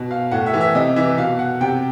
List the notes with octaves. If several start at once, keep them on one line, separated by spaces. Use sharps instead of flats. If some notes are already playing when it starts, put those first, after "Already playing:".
Already playing: B2
F5
A2 F#5
E5
E3
E5
C3 D#5
E3 E5
B2 F5
F#5
C3 G5